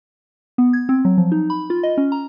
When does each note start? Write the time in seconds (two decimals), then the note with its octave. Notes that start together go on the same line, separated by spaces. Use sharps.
0.58 B3
0.73 G#6
0.89 C4
1.05 F#3
1.18 F3
1.32 D#4
1.50 B5
1.70 F4
1.83 D#5
1.98 C#4
2.12 A#5